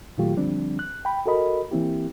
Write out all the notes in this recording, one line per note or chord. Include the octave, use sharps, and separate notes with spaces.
A#2 D#3 F#3 A3 F4 G4
D3 F3 G3 C4 D4
F#6
G5 B5
F#4 A4 A#4 D#5 B5
E3 A#3 C4 E4 G4